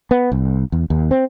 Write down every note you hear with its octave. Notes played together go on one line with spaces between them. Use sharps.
B3
C2
E2
D#2
C4